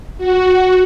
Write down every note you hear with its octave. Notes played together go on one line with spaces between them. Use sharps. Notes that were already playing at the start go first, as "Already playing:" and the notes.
F#4